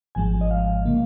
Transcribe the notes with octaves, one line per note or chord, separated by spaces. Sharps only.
G#1 G#2 F3 G#3 G#5
D#5
F5
C#3 A#3